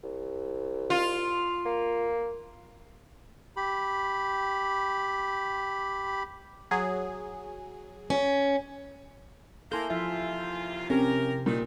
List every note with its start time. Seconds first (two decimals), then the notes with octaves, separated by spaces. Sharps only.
0.03 C2
0.90 F4
1.66 A#3
3.57 G4 B5
6.71 F#3 G#4
8.10 C#4
9.72 A#3 E4 A4 G#5 C6 G6
9.90 D#2 C3 F3 E4 F4 E5
10.90 C3 C4 C#4 G4 A#4
11.46 A#2 D#3 B3 D#4